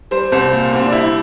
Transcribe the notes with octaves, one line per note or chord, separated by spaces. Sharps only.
G3 C5
C2 C5
A#2
C2 C4
D4
G3 E4